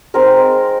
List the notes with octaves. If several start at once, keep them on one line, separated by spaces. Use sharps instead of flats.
G#3 C4 D#4 A#4